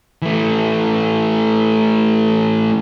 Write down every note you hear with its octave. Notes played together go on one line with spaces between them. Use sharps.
E3 A3